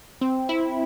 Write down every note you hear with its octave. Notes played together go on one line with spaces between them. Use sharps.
C4
E4